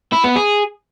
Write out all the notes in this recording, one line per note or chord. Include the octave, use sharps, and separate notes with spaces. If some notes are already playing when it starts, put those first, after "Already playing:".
E4
B3
G#4